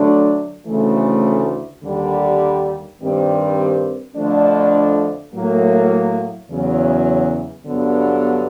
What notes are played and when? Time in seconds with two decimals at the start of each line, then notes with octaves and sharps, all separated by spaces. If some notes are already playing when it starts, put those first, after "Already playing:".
Already playing: D3 F#3 A3 D4
0.67 D2 C#3 E3 A3
1.83 D#2 D3 G3
3.00 G2 D#3 G3 C4
4.16 F2 D3 F3 A3 D4
5.34 A2 F#3 A#3
6.50 E2 C#3 F#3
7.66 G2 D3 F#3 B3